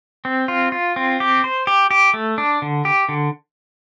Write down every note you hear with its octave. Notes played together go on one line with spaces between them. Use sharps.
C4
F4
F4
C4
G4
C5
G4
G4
A3
D4
D3
G4
D3